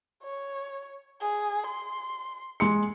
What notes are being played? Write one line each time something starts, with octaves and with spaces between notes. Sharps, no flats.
C#5
G#4
C6
G#3 C6 C#7